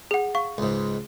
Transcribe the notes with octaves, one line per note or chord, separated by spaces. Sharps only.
G#4 F#5
F5 C#6
C#2 G#2